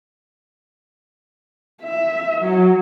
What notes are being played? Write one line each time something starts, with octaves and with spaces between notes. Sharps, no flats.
E5
F#3